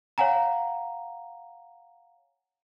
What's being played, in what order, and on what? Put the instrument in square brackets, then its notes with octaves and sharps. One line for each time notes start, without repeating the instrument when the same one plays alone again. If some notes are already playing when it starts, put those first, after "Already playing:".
[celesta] C#5 F5 F#5 G#5 A#5